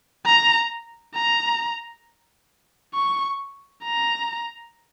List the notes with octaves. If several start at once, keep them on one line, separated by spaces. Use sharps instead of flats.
A#5
A#5
C#6
A#5